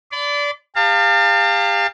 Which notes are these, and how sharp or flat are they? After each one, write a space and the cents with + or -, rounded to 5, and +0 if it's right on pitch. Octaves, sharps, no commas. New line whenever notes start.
D5 -20 B5 +40
G4 +35 F5 +0 A5 +40